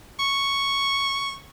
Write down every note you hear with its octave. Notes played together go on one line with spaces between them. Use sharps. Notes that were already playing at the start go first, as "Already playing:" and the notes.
C#6